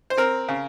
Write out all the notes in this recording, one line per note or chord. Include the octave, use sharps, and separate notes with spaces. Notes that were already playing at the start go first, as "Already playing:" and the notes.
C5
C4 A#4
C#3